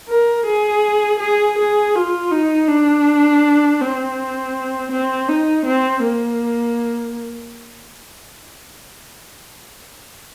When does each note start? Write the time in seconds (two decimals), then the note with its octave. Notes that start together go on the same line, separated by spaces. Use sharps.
0.09 A#4
0.46 G#4
1.20 G#4
1.58 G#4
1.95 F4
2.32 D#4
2.68 D4
3.81 C4
4.92 C4
5.29 D#4
5.66 C4
6.03 A#3